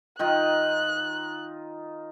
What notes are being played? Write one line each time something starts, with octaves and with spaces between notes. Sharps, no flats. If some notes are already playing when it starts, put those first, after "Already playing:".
D#3 D#4 F4 F#6